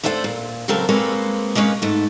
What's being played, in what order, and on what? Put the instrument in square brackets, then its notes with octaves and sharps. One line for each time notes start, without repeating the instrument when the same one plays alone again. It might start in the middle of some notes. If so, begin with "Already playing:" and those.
[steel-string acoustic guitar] A3 D4 A4 C5 F5 F#5
A#2
C#3 F#3 C4 A4 A#4
G#3 A#3 C4 A4 B4 C#5
G#3 A#3 C#4 B4 C#5
G#2 A3